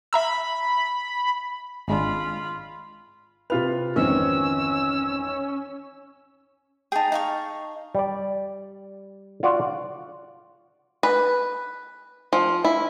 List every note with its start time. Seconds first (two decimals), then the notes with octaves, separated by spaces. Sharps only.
0.13 E5 A#5 B5 E6
1.88 G#1 G#3 D4 F4 B5
3.50 C3 F4 B4 F7
3.96 G#1 F2 D#3 E3 C4 C#4 E6
6.92 D#4 G#4 G5 A5
7.12 D#4 F5 C#6
7.95 G3 D5
9.43 F4 F#4 D5 F#5
11.03 B4
12.33 F3
12.64 E4